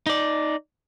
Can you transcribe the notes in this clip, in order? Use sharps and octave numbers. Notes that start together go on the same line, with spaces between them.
D#4 D5